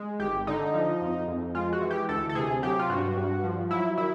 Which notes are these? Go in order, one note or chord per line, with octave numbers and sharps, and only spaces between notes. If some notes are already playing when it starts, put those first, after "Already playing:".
Already playing: G#3
G#1 G4
D3 D#4
F3
F2
F2
G#3 F4
F#4
E3
G4
D2 A4
A4
C3 G#4
F#3 G4
F4
G2 F#4
G2
F3
F#3 E4
D#3 E4